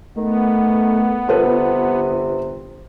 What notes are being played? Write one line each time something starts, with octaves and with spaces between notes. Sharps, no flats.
D#3 A3 B3
G1 C3 F4 A4 B4